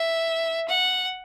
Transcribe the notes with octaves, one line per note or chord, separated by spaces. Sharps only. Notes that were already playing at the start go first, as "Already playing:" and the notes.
Already playing: E5
F#5